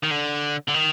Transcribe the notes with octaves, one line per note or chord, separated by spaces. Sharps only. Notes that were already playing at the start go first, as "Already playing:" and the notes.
D#3
D3
D3
D#3